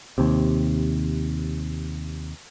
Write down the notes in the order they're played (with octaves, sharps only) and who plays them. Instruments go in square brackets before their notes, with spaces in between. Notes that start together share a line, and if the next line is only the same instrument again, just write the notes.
[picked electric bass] D#2 C3